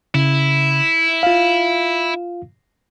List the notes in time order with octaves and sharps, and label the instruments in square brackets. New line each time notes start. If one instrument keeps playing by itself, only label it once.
[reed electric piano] C#3 [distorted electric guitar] E4
[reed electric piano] F4 F5